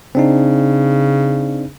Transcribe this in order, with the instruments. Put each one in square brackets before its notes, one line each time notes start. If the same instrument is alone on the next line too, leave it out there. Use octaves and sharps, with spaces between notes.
[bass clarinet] C#3 [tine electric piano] C4 D4 D#4